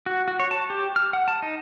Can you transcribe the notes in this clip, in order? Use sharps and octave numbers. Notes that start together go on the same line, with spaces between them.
F#4
F#4
C#5
A5
G4
F6
F#5
A5
D#4